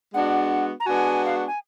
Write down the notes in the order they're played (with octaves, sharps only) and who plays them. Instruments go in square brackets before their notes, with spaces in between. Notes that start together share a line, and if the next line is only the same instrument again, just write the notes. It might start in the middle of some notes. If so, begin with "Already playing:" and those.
[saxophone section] G#3 B3 D4 F#4 [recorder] F#5
[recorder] A#5
[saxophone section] G#3 B3 D4 F#4 [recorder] G#5
[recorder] F5
F#5
G#5